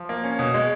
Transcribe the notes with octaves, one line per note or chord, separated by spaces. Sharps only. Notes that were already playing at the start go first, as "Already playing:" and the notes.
Already playing: F3
A#3
C#4
B2
G#3